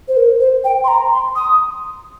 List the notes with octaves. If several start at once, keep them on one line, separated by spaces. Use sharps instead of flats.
C5
A#4
C5
G5
C6
A#5
C6
D#6